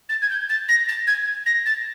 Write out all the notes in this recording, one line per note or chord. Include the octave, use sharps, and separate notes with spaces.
A6
G#6
G6
A6
A#6
A6
G#6
A#6
A6